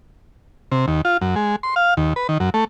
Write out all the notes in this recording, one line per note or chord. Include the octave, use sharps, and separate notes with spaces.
C3
D#2
F4
F#2
G#3
C6
F5
D#2
B4
D#3
F#2
A3